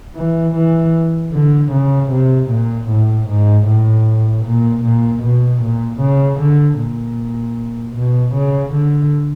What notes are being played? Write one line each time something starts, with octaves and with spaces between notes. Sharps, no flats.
E3
E3
D3
C#3
C3
A#2
A2
G#2
A2
A#2
A#2
B2
A#2
C#3
D3
A#2
B2
C#3
D3